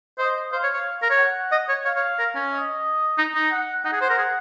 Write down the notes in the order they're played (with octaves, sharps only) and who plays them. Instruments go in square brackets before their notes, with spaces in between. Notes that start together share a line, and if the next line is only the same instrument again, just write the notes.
[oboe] C5 [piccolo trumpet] D#5
[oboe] C5 [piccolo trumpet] F5
[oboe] C#5
C#5
A#4
C#5
[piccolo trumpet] F#5
[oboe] D#5
C#5
[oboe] C#5 [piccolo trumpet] F5
[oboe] C#5
A#4
C#4
[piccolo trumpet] D#5
[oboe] D#4
D#4
[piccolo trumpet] F#5
[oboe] D#4 [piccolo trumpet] F#5
[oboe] G#4
C5
A#4
G#4